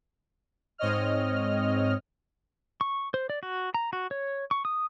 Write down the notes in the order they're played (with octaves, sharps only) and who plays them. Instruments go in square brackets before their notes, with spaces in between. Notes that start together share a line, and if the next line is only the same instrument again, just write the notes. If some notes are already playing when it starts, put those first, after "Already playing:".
[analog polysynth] G#2 C4 C#5 D#5 F6
[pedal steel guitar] C#6
C5
D5
F#4
A#5
F#4
C#5
C#6
D#6